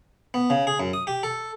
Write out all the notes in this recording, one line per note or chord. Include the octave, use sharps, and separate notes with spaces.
B3
C#3
G#4
F#2
D#6
G4
A4